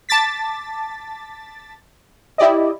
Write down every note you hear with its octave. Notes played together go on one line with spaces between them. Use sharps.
A5 D6 A6 B6
E4 G4 D5 D#5